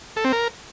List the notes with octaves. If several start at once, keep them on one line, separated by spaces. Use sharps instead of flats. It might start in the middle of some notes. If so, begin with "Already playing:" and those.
A4
C4
A#4